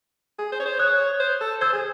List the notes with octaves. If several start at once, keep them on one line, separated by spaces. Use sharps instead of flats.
G#4
C5
C#5
C5
C#5 D#6 F#6
C5
A4
C5 E6 G#6
G#4